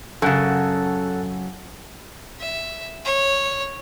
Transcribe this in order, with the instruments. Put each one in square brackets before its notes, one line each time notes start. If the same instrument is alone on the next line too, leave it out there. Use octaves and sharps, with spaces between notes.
[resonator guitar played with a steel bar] F#2 C#3 [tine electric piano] A4 F#5 A5
[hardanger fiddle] E5
C#5